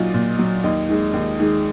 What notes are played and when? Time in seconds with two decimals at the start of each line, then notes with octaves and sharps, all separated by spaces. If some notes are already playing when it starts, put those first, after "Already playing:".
Already playing: A#2 F#3 D#4 F4
0.14 A#2
0.39 F#3
0.63 D#2 D#4
0.89 D#3 G#3
1.13 D#2
1.38 D#3 G#3